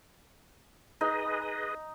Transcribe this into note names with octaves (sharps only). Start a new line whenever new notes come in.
D#4 G#4 B4 D#5